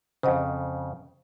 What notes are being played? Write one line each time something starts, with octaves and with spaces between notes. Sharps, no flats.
F2 C#3 C5 D#5 F#5